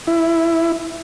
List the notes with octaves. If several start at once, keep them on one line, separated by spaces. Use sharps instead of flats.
E4